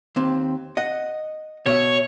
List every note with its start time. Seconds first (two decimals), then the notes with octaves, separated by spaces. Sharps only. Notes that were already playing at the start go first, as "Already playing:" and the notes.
0.16 D#2 C4
0.77 D#5 F#5
1.66 B2 C#5 D5 E5